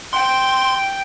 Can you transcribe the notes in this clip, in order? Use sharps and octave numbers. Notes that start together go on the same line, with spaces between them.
G5 C6